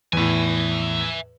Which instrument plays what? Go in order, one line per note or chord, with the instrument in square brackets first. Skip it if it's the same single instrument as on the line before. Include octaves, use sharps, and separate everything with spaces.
[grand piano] E2 A2 [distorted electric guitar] E5 G#5